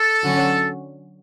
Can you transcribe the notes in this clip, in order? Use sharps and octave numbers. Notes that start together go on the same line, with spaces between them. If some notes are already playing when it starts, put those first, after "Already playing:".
Already playing: A4
D3 F#3 C#4 F#4